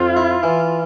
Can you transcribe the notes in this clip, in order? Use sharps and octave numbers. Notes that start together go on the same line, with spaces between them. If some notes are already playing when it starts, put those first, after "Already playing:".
Already playing: F2 F4
E4
E3